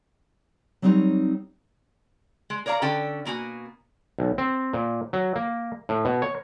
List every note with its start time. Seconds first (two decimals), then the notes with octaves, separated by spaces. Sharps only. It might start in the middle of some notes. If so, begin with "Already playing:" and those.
0.82 F#3 G3 C4 D4 D#4 C#5
2.50 G#3
2.66 A#4 C#5 D5 F5 A#5
2.82 D3 C#4 A4 G5
3.25 B2 A#3 F#4 G#5
4.19 B1
4.38 C4
4.73 A#2
5.13 F#3
5.36 A#3
5.89 A2
6.05 B2
6.22 C#5